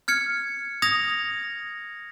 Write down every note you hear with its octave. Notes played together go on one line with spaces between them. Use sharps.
F6 G#6 C#7
D#6 G#6 A#6 F7